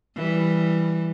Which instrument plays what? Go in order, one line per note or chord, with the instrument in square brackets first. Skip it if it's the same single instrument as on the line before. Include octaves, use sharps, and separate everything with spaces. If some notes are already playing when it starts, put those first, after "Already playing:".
[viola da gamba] E3 G3